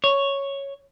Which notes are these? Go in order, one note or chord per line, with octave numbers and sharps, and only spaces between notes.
C#5